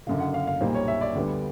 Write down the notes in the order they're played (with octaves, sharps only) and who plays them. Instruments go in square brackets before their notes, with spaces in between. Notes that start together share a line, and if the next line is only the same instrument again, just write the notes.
[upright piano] F#1 F#2 D3 F5
F#5
F5
F5
B1 A#2 G3 A#3 C5
C#5
E5
D5
D2 D3 G3 B3